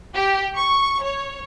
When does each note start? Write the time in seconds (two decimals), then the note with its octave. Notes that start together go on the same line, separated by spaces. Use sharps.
0.15 G4
0.56 C#6
1.03 C#5